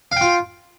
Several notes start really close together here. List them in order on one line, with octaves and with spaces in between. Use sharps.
F5 G5 F4